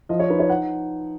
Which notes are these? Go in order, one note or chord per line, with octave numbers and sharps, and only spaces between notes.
F3 D#5
C#5
D#4 B4
C#5
F#5